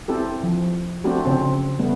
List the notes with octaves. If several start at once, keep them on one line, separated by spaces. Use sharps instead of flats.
C4 E4 G4 A4
F3
A3 C4 D4 F#4 G4
C#3 C4
G3 A3 B3